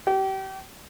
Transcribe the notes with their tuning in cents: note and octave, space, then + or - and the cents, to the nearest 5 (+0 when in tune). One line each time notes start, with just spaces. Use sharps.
G4 -30